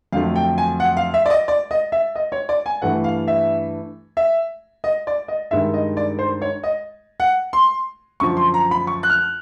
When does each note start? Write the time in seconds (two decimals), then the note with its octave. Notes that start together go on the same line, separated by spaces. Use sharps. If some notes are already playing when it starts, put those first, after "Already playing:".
0.13 F2 D3 F#3 A3 F5
0.36 G5
0.58 G#5
0.80 F#5
0.97 F5
1.14 E5
1.26 D5
1.30 D#5
1.48 D5
1.71 D#5
1.92 E5
2.15 D#5
2.32 C#5
2.49 D5
2.66 G#5
2.82 G2 E3 A3 F#5
3.04 F5
3.28 E5
4.17 E5
4.84 D#5
5.07 D5
5.28 D#5
5.51 G2 D#3 G#3 E5
5.74 D#5
5.97 D5
6.19 C5
6.42 C#5
6.64 D#5
7.20 F#5
7.53 C6
8.20 F#2 D3 F3 C#6
8.37 C6
8.54 A#5
8.71 B5
8.87 C#6
9.03 F#6
9.10 F6